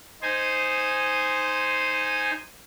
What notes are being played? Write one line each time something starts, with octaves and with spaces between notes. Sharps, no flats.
D#4 C5 G#5